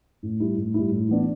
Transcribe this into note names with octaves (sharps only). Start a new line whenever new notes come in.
A2
G3 E4
A2
G3 E4
A2
E3 B3 D4